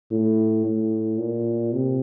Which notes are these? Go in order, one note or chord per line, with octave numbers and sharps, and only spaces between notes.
A2
A2
A#2
C3